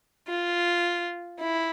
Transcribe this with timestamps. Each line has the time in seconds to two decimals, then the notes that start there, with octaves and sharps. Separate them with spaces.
0.28 F4
1.39 E4